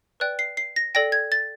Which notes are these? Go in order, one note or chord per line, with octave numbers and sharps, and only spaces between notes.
B4 D5 G5 F#6
C7
C7
A#6
A4 D5 G5 A#6
G#6
A6